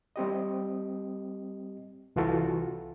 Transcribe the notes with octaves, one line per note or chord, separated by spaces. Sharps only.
G3 C4 G4 D#5
C2 E3 F4 F#4 A4